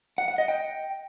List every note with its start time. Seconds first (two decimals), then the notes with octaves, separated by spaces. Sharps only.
0.18 F#5
0.28 F#5
0.38 D#5
0.48 G5